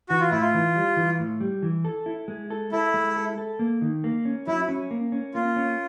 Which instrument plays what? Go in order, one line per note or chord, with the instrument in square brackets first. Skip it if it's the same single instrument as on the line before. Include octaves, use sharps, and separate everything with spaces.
[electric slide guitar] E3 [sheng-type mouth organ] F#4
[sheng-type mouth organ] F4
[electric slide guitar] A2 [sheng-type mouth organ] E4
[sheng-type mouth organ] F4
[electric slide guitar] E3
G3
E3
A2
G3
E3
A4
E4
G#3
A4
[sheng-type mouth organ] E4 [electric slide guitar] A4
[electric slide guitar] G#3
A4
A4
A#3
D#3
A#3
C#4
[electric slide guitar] F#3 [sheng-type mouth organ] E4
[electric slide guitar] C#4
A#3
C#4
[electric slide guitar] A#3 [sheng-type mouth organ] F4
[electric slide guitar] C#4